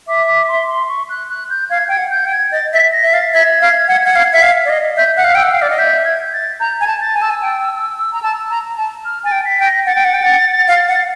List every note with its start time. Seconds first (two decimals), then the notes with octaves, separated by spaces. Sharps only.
0.08 E5 D6
0.28 D6
0.48 C6
0.68 C6
0.89 C#6
1.09 F#6
1.30 F#6
1.50 G6
1.70 F5 G#6
1.88 G5 G#6
1.98 F#5
2.11 G6
2.25 G5
2.32 G#6
2.52 D#5 A6
2.73 E5 B6
2.92 A#6
3.03 E5
3.13 F5 A6
3.34 E5 G#6
3.61 F5
3.88 F#5
4.05 F#5
4.15 F5
4.33 E5
4.42 F5
4.65 D5
4.70 D#5
4.97 E5 G6
5.17 F#5 F#6
5.24 F5
5.33 G5 E6 F6
5.43 F#5
5.51 F5
5.59 D5 F6
5.70 D#5
5.78 E5 G6
6.05 G#6
6.33 A6
6.59 A#5 G6
6.80 G#5 G#6
6.87 A5
7.01 A6
7.14 G#5
7.22 A5 E6
7.30 G#5
7.42 G5
8.13 A#5
8.23 A5
8.50 A#5
8.77 A5
9.05 F6
9.24 G#5 A6
9.32 G5
9.45 B6
9.59 G5
9.65 A#6
9.86 F#5 A6
9.95 G5
10.05 F#5
10.14 G5
10.22 F#5
10.68 F5
10.88 F#5